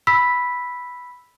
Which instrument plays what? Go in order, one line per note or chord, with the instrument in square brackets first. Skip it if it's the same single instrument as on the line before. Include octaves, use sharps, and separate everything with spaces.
[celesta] B5 E6 B6